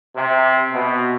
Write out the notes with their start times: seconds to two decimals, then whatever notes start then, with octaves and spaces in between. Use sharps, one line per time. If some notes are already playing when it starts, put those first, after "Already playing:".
0.16 C3
0.73 B2